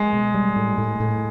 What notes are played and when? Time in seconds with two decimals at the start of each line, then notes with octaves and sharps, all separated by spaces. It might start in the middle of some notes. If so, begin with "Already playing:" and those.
Already playing: G#3
0.13 B2
0.34 G3
0.56 A2
0.78 A2
1.00 A2